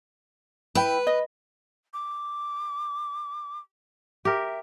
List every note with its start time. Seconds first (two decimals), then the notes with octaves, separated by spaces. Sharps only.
0.75 E4 B4 G5
1.07 D#5
1.93 D6
4.25 G4 A#4 E5